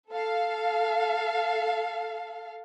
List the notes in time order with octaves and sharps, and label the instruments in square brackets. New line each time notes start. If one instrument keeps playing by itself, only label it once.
[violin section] A4 F5